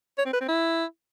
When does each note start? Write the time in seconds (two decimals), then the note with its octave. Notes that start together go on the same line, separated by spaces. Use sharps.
0.18 C#5
0.25 C4
0.33 B4
0.41 C4
0.48 E4